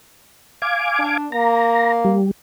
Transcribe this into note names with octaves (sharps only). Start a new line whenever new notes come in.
F5 G#5 D6
D4
A#3 A#5
G3